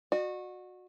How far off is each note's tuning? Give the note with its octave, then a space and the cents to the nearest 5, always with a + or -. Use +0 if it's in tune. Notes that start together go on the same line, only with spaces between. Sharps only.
F#4 -20 D5 +45